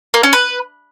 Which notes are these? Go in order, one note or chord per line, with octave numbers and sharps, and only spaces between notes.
A#3
C#4
B4